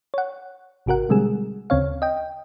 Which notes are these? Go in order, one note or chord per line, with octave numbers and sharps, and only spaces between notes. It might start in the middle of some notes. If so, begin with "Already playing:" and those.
C#5 F#5
G#1 C3 F#4 A#4 F#5
B2 D3 G3 G#3 C4 G#4
D2 C#3 C4 C#5 F5
D#5 G5